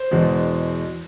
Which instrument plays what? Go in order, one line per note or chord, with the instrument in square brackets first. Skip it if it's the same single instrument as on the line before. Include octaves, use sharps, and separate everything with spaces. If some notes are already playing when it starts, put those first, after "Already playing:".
Already playing: [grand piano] C5
E2 B2 G#3